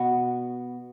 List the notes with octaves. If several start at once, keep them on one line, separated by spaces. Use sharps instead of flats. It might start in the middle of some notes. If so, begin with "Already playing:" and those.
Already playing: B2 B3 F#4